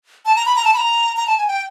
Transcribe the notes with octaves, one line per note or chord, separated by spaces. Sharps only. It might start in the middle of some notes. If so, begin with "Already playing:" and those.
A5
A#5
B5
A#5
A5
B5
A#5
A#5
A5
G#5
G5